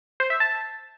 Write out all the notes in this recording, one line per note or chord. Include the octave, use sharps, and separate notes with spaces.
C5
E5
A5